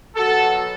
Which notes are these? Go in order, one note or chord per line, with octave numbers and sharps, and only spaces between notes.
B2 F#3 F#4 A4